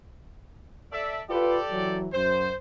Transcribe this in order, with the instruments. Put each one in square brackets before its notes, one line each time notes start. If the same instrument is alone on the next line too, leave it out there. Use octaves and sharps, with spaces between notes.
[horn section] A4 D5 E5
[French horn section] F4 B4 [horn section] G4 A4 D5
[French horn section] E3 F#3
[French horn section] F#2 [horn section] C5